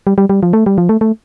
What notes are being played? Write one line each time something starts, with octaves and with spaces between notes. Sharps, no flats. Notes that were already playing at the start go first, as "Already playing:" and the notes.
G3
G3
G3
F3
A3
G3
F3
A3
A3